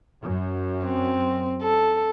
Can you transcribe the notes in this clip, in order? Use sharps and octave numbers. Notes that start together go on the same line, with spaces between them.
F#2
C4
A4